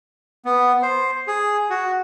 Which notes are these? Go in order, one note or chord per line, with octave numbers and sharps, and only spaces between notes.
B3
C5
G#4
F#4